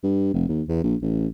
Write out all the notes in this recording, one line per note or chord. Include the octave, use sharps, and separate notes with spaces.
G2
F1
D#2
E2
A#1
A1